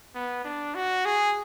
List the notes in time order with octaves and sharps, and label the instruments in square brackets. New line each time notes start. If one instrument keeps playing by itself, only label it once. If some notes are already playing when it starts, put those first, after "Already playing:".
[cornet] B3
D4
F#4
G#4